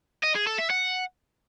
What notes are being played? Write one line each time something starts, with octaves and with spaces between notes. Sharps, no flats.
D#5
G#4
A4
E5
F#5